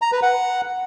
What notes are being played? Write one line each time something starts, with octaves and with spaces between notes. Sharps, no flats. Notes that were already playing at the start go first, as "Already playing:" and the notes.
A#5
B4
F#5